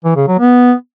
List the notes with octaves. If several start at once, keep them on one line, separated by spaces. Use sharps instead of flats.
E3
C#3
F#3
B3